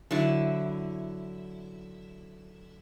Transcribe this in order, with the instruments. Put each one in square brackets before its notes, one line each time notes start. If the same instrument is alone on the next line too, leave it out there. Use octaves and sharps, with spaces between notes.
[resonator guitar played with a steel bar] D3 F#3 E4